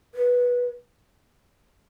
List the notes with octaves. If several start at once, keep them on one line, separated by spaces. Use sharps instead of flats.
B4